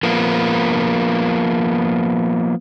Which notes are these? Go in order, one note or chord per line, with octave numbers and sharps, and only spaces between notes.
F3 A#3 B3